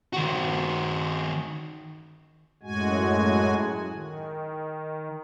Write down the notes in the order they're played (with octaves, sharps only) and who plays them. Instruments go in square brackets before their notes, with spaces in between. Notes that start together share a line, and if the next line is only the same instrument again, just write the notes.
[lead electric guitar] D#3 F#4
[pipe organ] F#2 A2 G#3 F#4 G#5
D#3